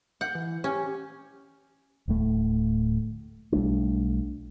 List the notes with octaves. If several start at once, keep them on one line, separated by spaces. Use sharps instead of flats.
F#5 G6
E3
C#4 G4
D1 A2 A3
B1 G3 A3 D4